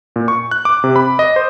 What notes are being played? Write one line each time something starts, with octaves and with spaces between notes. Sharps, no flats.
A#2
C#6
F#6
D6
C3
B5
D#5
C5